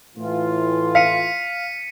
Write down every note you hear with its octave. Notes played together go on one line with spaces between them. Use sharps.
A2 E3 F4
F5 B6 C#7 D#7